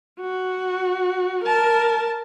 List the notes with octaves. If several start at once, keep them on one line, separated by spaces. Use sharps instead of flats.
F#4
A#4 A5